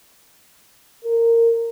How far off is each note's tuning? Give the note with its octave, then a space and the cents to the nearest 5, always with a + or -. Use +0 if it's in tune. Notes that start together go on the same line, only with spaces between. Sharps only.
A#4 -15